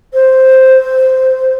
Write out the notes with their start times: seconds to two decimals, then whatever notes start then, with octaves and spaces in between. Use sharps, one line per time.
0.13 C5